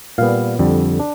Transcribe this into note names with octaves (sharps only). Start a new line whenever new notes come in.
A#2 G3 B3 F5
F2 D3 G3
D4